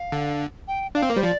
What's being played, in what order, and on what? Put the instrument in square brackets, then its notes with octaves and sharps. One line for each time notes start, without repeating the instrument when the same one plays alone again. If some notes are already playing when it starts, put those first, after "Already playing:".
Already playing: [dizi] F5
[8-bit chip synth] D3
[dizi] G5
[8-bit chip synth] D4 [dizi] F5
[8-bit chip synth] C4
A#3
[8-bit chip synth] G3 [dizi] C5
[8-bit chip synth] F3 [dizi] D5